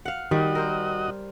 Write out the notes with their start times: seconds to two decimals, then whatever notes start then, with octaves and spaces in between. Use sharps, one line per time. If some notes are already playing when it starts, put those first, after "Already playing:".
0.05 F5 F#5
0.31 D#3 G3 F#4 D#5
0.55 A#4 C5